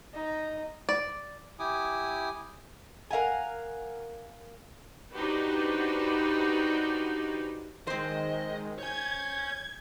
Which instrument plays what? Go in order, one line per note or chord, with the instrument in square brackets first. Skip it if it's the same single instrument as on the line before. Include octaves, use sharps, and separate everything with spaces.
[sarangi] D#4
[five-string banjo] D5
[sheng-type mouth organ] E4 G4 G#5 D6 D#6
[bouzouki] A#4 F5 F#5 G#5
[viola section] D4 D#4 F#4 G4 B4 C5
[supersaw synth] D#3 G#3 [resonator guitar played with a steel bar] C4 C5 [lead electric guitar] D#5
[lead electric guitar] C#5 G#5 [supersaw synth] G6 [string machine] G#6